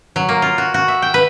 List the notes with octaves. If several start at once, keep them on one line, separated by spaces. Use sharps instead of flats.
F#3
A#3
F4
F#4
F#4
E5
G5
B4